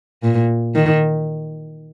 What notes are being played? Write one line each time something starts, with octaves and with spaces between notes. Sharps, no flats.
A#2
D#3